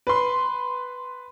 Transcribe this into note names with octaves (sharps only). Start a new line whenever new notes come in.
B4 C6